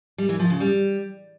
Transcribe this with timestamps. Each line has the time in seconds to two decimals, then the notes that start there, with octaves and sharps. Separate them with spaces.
0.18 G3
0.29 E3
0.39 F3
0.50 C#3
0.60 G3